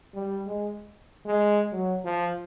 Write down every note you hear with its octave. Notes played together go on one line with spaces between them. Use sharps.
G3
G#3
G#3
F#3
F3